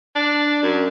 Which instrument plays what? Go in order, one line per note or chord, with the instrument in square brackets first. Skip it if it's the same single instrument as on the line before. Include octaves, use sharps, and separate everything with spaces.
[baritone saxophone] D4
F#2